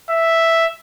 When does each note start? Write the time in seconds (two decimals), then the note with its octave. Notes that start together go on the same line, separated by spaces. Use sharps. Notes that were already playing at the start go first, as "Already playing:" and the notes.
0.10 E5